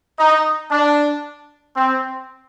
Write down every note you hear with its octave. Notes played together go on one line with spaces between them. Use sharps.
D#4
D4
C4